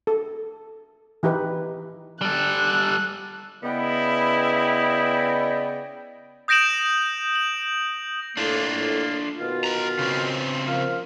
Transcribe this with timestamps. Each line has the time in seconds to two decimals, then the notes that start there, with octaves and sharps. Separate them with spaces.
0.07 A4
1.23 E3 D#4 G4 B4
2.21 G3 A4 F#6
3.64 C#3 B3 E4 D5 D#5 G5
6.48 D#6 G6 A#6 D7 E7 F#7
7.35 F#7
8.37 A2 A#3 D4 F4
9.39 B2 D#3 F4
9.64 B4 A#5
9.99 C#3 C4
10.67 F3 A#3 F5